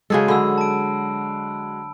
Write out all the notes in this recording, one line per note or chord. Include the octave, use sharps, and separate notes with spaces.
C#3 G#3 F#4 G#4 A4
D3 F#3 B5 E6
A5 D7